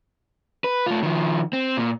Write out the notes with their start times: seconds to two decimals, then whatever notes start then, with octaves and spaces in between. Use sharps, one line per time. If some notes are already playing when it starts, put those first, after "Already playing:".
0.64 B4
0.86 A3 F4
1.03 D#3 F3
1.53 C4
1.77 A#2